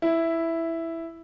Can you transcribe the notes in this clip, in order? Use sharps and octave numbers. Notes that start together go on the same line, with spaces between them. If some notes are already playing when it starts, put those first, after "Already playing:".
E4